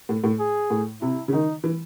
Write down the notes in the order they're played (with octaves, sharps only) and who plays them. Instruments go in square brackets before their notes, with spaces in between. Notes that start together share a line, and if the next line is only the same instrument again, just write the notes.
[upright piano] A2
A2
[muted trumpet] G#4
[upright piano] A2
[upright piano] C3 [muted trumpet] E4
[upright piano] C#3
[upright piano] D#3 [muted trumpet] D#4
[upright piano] E3